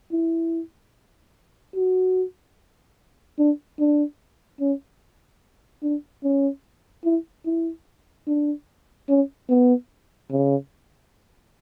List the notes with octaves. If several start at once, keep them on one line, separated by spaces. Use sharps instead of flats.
E4
F#4
D4
D4
C#4
D4
C#4
E4
E4
D4
C#4
B3
C#3